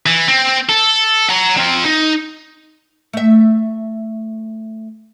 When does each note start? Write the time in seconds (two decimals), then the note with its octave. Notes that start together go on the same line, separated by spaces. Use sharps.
0.06 E3
0.28 C4
0.69 A4
1.29 F#5 A#5
1.57 C4 F4
1.85 D#4
3.13 A3 E5